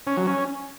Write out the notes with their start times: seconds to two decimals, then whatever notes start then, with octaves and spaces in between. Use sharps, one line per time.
0.07 C#4
0.17 F#3
0.27 C#4